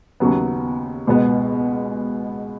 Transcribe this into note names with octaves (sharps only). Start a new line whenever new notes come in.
D#2 C#3 F#3 B3
C#2 B2 G#3 B3